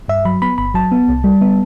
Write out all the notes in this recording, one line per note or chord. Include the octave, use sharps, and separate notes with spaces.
G2 E5
F#3 B5
B3 B5
G1 B5
F#3 A5
B3
C2
G3
B3